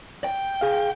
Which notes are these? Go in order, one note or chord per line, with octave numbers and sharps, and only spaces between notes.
G5
G#4 F5